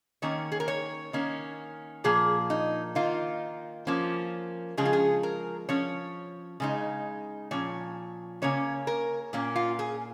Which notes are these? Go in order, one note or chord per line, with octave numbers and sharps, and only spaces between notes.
D#3 A#3 C#4 C#5
G#4
A#4
C#5
D#3 A#3 C#4
A#2 F3 A#3 G#4
D#4
D#3 A#3 D#4 F4
F3 A#3 C#4
C#3 F3 G#3 C#4 G#4
F4
G#4
A#4
F3 C#4 C#5
C#3 G#3 D#4
A#2 F3 C#4 C#5
C#3 A#3 C#4 C#5
A#4
A#2 A#3 C#4
F4
G#4